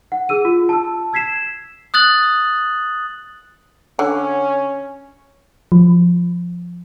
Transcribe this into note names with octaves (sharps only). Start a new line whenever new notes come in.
F#5
G#4 E6 D#7
F4
A5 E6
E6 G#6 B6 C7 E7
D#6 F#6 A6 F#7
D3 C#4
F3